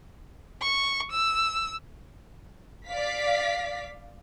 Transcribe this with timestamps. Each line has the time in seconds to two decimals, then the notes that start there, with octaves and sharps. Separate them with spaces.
0.62 C#6
1.12 E6
2.88 D5 F5 B6